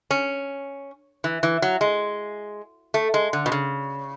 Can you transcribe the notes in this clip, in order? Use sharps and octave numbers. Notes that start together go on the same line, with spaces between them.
C#4
E3
E3
F#3
G#3
A3
G#3
D3
B2
C#3